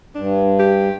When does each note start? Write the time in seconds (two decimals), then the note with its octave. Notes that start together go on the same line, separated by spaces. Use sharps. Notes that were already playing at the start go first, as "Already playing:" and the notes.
0.15 G2 D4
0.59 G4